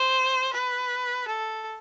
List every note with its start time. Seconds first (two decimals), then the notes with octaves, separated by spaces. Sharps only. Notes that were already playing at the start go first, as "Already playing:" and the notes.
Already playing: C5
0.53 B4
1.28 A4